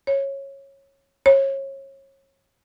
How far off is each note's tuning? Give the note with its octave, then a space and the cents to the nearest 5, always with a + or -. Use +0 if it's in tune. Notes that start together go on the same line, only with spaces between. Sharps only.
C#5 -15
C#5 -30